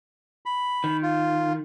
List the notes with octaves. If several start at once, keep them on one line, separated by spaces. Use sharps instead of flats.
B5
D#3
F4